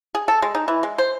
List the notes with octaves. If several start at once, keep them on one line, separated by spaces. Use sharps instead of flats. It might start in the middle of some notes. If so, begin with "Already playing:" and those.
G#4
A4
G#3
D#4
E3
G#3
C5